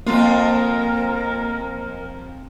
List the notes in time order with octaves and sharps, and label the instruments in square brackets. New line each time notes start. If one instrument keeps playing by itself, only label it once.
[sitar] F2 F4 [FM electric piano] A#3 [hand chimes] C4 C6 [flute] A#4